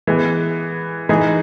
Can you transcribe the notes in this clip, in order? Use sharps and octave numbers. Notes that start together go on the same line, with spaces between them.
E3 G#3 B3
E3 G#3 D#4 G#4